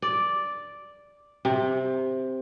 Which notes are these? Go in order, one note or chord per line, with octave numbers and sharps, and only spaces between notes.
D5
C3